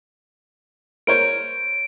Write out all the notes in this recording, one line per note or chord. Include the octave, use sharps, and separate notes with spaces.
A#4 C5 C#5 D7